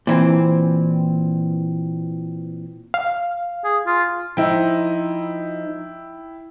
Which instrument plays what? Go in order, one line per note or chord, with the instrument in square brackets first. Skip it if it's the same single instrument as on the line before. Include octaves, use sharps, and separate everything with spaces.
[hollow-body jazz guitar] A#2 E3 C4
[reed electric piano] F5
[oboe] G#4
F4
[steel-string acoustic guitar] F3 D#4 [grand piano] E4 G5